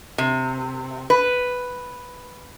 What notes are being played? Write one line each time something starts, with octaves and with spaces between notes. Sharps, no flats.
C3
B4